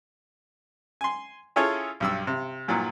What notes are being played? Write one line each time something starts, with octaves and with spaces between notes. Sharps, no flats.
G#5 C6
C#4 E4 F4 G#4 A4 C#5
B1 G2 E6
C3
G2 A#2 E3 F#3